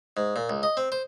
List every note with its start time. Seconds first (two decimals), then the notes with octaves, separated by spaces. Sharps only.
0.17 G#2
0.36 A#2
0.50 C#2
0.63 D#5
0.77 C4
0.92 C5